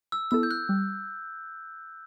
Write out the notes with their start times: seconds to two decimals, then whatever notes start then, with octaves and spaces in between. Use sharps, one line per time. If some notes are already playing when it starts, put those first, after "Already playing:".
0.12 E6
0.31 B3 E4 A4 E6
0.43 G6
0.51 F#6
0.69 G3